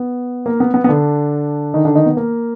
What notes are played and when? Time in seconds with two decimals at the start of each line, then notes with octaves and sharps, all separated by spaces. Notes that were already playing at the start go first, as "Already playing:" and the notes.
Already playing: B3
0.46 A#3
0.60 B3
0.74 B3
0.84 B3
0.89 D3 D4
1.74 D#3 D#4
1.85 D3 D4
1.95 D#3 D#4
2.06 B3
2.17 A#3